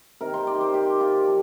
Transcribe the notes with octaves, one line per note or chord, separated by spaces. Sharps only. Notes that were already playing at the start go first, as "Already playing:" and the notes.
C3 D#3 A#4
C5
D5
C5
G4
F4
F3